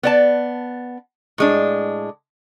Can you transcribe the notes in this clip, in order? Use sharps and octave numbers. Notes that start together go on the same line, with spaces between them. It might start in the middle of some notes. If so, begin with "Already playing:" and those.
B3 D5 A5
A2 G#3 D4